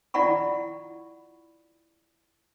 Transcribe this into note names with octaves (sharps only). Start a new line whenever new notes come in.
E4 F4 D5 F#5 B5 C#6